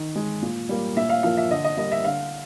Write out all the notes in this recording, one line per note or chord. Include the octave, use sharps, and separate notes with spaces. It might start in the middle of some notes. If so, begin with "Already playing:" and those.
Already playing: D#3
G#3
A#2
G3 A#3
A#2 E5
F5
F3 A#3 F5
E5
D3 D#5
D#5
G3 A#3 D#5
E5
D3 F5